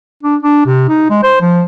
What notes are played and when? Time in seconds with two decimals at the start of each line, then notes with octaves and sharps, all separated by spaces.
0.23 D4
0.43 D4
0.66 C3
0.89 D#4
1.10 G#3
1.23 C5
1.41 F3